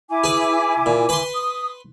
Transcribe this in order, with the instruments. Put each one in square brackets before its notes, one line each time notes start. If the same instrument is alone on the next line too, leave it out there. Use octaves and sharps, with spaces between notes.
[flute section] E4 G#5 D6
[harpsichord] G#4 B4
A#2
B4 C6
[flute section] D#6